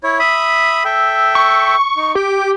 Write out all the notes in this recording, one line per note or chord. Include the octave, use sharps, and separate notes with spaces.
E4 C#5
E5 B5 D#6
A4 E5 G5
C#6
D#4
G4 D6